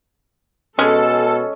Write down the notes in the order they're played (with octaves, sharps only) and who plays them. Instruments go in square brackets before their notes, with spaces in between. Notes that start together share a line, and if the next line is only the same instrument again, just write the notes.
[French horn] B2 [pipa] G#3 [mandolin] C#4 [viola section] A4